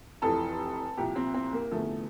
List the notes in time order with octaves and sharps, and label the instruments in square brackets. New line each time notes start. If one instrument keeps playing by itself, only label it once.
[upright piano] F1 F2 E3 A4
C2 A#2 F3 G4
C4
C4
A#3
F1 E2 D3 F3 A3